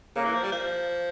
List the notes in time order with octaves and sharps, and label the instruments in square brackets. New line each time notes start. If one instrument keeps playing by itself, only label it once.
[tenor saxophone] C#3 [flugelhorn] A#3
[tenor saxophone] E3
F3
G3
F3